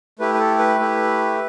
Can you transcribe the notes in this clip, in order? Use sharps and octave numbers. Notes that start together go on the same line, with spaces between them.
A3 E4 G4 B4
B4
A4
B4
A3 E4 G4